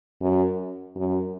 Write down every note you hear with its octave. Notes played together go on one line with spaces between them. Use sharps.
F#2
F#2